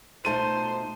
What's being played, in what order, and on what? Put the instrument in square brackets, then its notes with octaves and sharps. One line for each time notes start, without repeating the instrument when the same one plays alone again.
[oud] B2 A3 F4 [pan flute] D#4 [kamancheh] C5 [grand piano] A5 D#7